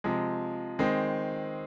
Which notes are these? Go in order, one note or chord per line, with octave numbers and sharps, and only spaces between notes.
C3 F3 G#3
D#3 G#3 C4